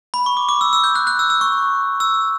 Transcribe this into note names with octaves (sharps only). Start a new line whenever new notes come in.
B5
C#6
D6
D6
E6
E6
G6
F#6
F#6
E6
E6
C#6
E6